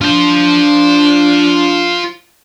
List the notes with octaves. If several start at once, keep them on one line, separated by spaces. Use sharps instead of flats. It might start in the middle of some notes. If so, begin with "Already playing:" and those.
D4 F4 C5